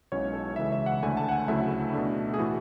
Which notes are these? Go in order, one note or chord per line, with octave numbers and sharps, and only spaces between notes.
B1 B2 G#3 C#4 E4 C#5
A4
C#2 C#3 E3 G#3 E5
E5
F#5
D2 D3 A3 G#5
A5
F#5
G#5
D2 C#3 F#3 A3 E4 E5
B2 A3 D4
G#4
A2 E3 A3 E4 F#4